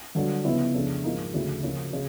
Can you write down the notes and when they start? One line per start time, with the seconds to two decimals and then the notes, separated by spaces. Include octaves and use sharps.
0.15 G2 D3 F#3
0.44 C#3 F3 G#3 B3 E4
0.74 F2 C#3 F3 A3 D4
1.04 G#2 F3 A#3 D#4
1.33 D2 C#3 F3 A3
1.63 C#3 F3 A#3 C#4
1.93 C#3